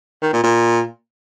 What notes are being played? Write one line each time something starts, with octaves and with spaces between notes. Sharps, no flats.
D#3
A#2
A#2